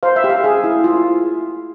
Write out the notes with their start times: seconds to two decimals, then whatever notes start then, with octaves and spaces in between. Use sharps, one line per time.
0.03 C5 F5
0.16 E5
0.24 G4
0.29 F5
0.44 G#4
0.64 E4
0.84 F4